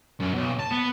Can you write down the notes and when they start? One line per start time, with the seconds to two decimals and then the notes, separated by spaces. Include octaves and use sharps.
0.20 F#2
0.34 B1
0.59 A5
0.71 B3